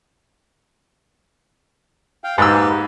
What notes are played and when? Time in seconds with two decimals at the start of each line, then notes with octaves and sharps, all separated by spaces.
2.24 F5 G5
2.38 G#2 A#3 G4 B4 E6